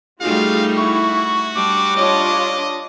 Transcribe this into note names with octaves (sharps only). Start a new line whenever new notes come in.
G3 A3 D#4 F4 F#4 G#4 F5
E4 F#4 C#6
G3 D4 D6
D4 F4 C#5 D#5